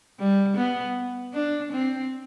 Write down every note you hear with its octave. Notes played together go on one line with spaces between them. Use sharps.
G3
B3
D4
C4